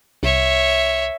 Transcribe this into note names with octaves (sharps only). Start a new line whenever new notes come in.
C2 C#5 E5